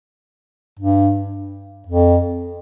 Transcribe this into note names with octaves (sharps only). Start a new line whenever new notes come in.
G2
F2